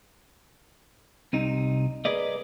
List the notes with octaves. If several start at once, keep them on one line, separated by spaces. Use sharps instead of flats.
C2 C3 D#4
G#4 A#4 B4 D5 D#5